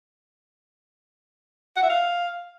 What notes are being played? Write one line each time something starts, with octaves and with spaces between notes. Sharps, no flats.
F#5
E5
F5